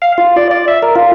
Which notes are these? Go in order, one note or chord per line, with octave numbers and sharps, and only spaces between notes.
F5
F4
D5
D5
E5
A#4
F4